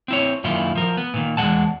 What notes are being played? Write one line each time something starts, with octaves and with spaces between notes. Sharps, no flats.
C4 E4 C#5
F#2 A#2 D#3 E4 F4
F3 A#4
B3
A#2 D#3
E2 G2 G#3 F#5 A5